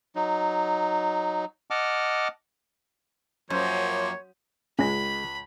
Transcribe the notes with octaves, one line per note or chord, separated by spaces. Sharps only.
F#3 D#4
D#5 F#5 A5 D6 F6
F#2 F3 A#3 C5 C#5
C#2 G#3 C#4 B5 A#6